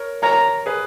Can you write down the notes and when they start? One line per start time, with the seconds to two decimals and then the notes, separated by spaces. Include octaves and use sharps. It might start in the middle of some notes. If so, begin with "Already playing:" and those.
Already playing: A#4 C#5
0.23 A#4 C#5 A#5
0.66 G#4 B4